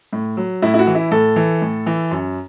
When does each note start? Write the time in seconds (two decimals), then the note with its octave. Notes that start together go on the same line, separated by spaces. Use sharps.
0.13 A2
0.37 F#3
0.62 A2 E4
0.74 E4
0.79 F#4
0.87 E3
0.95 E4
1.11 A2 A4
1.36 E3
1.62 A2
1.86 E3
2.11 F#2